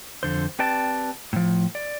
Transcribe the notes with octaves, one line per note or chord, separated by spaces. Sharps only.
F2 D3 C5
C4 G4 B4 D5 G5 A5
A2 F3
D5